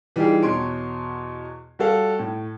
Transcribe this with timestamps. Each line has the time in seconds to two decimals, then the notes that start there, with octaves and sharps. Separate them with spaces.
0.16 E3 G3 D#4 F4 G4 G#4
0.43 E2 B2 C#5 C6 D7
1.79 G3 F#4 A4 F5
2.19 A2